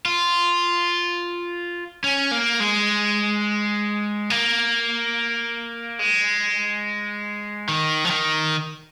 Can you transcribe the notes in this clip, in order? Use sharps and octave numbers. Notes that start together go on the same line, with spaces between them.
F4
C#4
A#3
G#3
A#3
G#3
D#3
F3
D#3